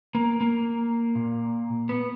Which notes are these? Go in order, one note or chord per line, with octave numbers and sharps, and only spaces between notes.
A#3
A#3
A#2
B3